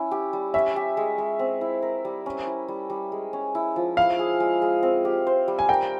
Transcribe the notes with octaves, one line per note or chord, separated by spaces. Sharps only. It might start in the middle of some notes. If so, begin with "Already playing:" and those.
Already playing: C#4 E4
G4
G3
C#4 E5
G4
G#3
G#3
C4
E4
A#4
G3
C#4
E4
G3
G3
G#3
C#4
E4
F3
E4 F5
G#4
G#3
G#3
C4
G4
C5
G3
G#5
A#4 G5